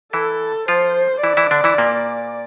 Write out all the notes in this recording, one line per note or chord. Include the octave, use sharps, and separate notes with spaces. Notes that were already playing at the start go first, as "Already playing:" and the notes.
E3 E4 A4
F3 F4 C5
E3 E4 D5
E3 E4
D3 D4
E3 E4
A#2 A#3